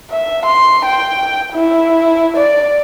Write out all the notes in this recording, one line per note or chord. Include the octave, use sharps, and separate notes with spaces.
E5
C6
G5
E4
D5